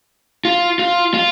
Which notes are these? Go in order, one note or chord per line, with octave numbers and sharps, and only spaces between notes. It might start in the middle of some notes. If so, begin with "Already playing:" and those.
F4
F4
F4